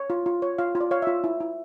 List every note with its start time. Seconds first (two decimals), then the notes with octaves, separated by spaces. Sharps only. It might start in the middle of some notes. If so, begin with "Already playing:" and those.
Already playing: C#5
0.10 F4
0.26 F4
0.42 C#5
0.59 F4 F5
0.75 F4
0.81 D5
0.91 C#5 F5
1.02 F4 E5
1.24 E4
1.40 E4